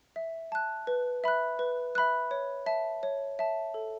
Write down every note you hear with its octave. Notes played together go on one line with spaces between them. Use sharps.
E5
A5 F#6
B4
E5 B5 F#6
B4
E5 B5 F#6
C#5
E5 A5
C#5
E5 A5
A4